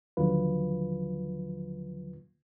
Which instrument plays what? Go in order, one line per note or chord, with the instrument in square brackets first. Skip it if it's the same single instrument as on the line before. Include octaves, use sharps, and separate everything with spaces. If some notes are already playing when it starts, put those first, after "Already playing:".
[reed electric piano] D#2 D3 F3 F#3 F4 B4